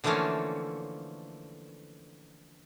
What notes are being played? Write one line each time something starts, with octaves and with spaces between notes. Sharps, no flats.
D3 E3 F3 A3 A#3 C#4